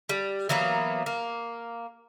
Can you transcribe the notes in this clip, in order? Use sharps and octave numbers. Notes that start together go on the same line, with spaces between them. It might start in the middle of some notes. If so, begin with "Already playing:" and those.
G3
E3 F#3 A#3 B3
A#3